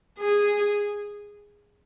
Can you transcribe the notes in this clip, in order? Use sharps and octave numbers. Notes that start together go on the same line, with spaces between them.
G#4